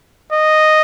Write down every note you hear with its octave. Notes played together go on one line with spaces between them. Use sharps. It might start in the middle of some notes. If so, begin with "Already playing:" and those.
D#5